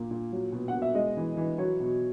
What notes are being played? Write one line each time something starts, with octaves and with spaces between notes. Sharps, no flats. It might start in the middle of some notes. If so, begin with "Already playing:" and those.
Already playing: A#2 A#3
A#2
F#3
B2
F#5
B2
E5
G#3 D#5
E3
E3
F#3 C#5
B2